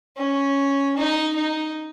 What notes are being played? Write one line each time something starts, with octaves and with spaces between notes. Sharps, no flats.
C#4
D#4
D#4